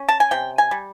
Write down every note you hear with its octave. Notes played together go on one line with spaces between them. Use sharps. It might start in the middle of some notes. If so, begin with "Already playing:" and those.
Already playing: C#4
A5
G#5
C3 G5
G#5
G3